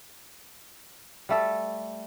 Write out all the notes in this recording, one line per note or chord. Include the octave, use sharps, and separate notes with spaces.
G3 A3 A4